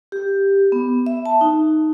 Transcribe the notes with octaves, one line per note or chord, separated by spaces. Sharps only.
G4
B3
E5
A5
D#4